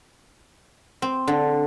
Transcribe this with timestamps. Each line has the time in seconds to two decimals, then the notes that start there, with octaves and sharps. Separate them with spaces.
1.02 C4
1.27 D3